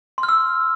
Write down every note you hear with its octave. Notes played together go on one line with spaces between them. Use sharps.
C6
F6
E6